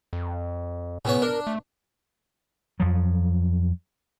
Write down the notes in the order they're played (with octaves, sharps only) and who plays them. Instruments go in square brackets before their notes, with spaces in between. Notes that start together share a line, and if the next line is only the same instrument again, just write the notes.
[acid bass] F2
[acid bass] A2 [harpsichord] C#3 B3 C#5
[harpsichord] D4 [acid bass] A#4
[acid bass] A3
[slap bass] F2 F3 F#3